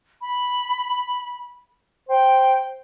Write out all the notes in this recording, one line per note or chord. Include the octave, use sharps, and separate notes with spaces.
B5
C5 G5